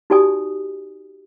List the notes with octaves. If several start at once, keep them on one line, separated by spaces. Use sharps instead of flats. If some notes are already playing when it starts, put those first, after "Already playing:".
D#4 F#4 G4 D5 G#5 D#6